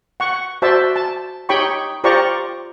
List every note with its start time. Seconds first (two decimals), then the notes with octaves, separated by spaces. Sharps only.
0.20 F#5 C#6
0.62 F#4 C5 D5 E5 A5
0.96 A5
1.49 D#4 G4 C#5 G5 B5 C#6
2.04 F4 G4 C5 D5 A#5 C#6